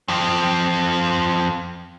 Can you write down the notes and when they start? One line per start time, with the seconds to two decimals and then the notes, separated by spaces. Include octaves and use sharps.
0.08 F2 C4